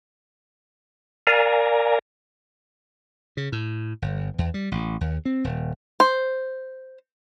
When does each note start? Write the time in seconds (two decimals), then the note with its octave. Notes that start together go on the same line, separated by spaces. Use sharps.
1.27 A#4 D5 F5 G#5 A#5
3.37 C#3
3.52 A2
4.02 G1
4.38 E2
4.54 G3
4.72 A1
5.01 D#2
5.25 C4
5.44 D#1
6.00 C5